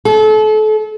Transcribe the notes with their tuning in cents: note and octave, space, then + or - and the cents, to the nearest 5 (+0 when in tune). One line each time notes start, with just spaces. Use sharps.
A4 -35